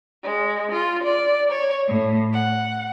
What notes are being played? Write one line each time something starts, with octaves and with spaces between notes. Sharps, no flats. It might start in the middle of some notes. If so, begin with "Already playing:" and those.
G#3
F4
D5
C#5
A2
F#5